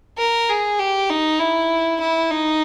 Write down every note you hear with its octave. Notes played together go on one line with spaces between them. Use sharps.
A#4
G#4
G4
D#4
E4
E4
D#4